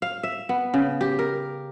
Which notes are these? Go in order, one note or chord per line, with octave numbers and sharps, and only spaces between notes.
F5
E5
B3
C#3
G4
A#4